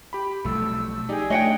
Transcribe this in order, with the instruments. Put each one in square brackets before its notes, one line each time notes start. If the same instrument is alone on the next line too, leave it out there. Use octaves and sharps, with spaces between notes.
[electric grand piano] G4 B5
[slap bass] B1 F3 G3 [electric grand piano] A3 [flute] E6
[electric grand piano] D#4 G4 D5 [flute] G#4
[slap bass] A3 [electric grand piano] D4 C#5 [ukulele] D#5 F#5 G5